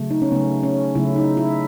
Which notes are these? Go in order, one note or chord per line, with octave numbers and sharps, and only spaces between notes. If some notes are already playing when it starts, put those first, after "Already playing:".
Already playing: C#3 F#3 A3
D#4
C#4
C#3 F#3 A3 B3
C#4
C#3 F#3 A3 E4
D#4
E4